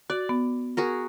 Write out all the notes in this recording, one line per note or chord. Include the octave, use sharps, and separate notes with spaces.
F#4 D5
B3
F#4 G#4 A#4